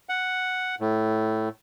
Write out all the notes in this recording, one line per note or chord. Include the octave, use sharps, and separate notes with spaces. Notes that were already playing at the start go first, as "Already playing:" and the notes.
F#5
A2